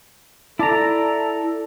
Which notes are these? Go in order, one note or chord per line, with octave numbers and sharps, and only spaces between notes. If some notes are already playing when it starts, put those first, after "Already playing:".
E4 A4 D5 A5 A#5 D6